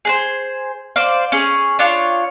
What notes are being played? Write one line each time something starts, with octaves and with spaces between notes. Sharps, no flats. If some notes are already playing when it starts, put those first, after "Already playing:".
G#4 B4 C5
C5 D5 F5
C#4 G#4
D4 F4 C#5